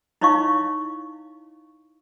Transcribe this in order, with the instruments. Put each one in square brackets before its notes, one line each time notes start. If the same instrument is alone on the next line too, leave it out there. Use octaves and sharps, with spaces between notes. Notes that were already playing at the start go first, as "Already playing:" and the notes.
[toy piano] D#4 E4 C#5 D#5 F5 C#6